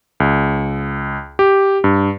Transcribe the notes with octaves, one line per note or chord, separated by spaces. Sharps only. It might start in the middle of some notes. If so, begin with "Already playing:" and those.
C#2
G4
G2